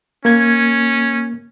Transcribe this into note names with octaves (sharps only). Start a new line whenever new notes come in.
A#3 C#4 G#6